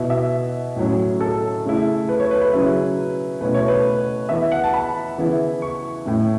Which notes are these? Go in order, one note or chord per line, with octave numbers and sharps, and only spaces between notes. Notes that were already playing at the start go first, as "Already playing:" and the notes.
Already playing: B2 B3 E4 E5
E5
A2 F#3 C#4
A4
C#3 A3 E4
B4
C#5
B4
B4
C#3 F#3 C#4 E4
B2 A3 C#4 E4 B4
C#5
B4
E3 B3 E4 E5
F#5
A5
B5
C#3 E3 B3 E4
C#6
A2 A3 C#4